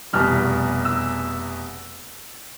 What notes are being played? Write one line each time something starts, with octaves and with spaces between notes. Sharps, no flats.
F1 E2 B2 G3 F6
E6